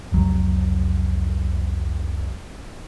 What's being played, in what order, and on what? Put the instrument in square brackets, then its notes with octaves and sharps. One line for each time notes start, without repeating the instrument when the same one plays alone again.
[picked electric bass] F1 C2 F#3